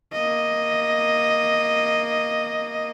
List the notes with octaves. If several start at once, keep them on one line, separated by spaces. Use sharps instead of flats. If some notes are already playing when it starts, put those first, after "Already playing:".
A#3 D#5